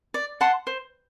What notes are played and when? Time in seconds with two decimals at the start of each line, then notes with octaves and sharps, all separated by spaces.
0.14 D5
0.41 F#5 A5 C6
0.67 C5